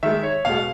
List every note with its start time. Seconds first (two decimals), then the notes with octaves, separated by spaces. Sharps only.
0.03 D#3 G#3 E5
0.23 C#5
0.45 B2 G#3 F5